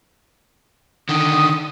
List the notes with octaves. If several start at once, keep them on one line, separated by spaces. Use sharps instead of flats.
D3 D#3 D#6